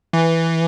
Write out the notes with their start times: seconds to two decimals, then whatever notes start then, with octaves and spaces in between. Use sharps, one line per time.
0.13 E3